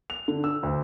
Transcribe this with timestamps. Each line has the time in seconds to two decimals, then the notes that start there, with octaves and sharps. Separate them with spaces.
0.10 F7
0.28 D3
0.44 E6
0.63 D2